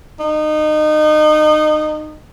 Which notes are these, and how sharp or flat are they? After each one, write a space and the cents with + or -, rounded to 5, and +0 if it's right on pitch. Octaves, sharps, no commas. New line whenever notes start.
D#4 -25